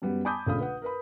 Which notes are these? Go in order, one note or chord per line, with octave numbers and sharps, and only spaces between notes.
F#2 G3 B3
G#5 A5 B5 D6 D#6 G6
A#1 C#3 A3 F5 B5 D#6
B4 F#5
A#4 B4 B5